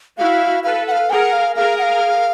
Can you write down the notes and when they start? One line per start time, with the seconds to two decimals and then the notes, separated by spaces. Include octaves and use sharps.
0.18 E4 F#4 F5
0.64 A4 B4 F5
0.87 F#5
0.91 F5
1.10 G#4 A#4 F#5 G#5
1.33 F5
1.55 G#4 A#4 F5
1.78 F#5
1.83 F5